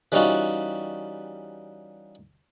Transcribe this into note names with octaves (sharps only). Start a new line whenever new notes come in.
E3 G3 C#4 D#4 F4 F#4